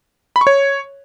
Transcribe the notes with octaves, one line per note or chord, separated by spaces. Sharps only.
B5
C#6
C#5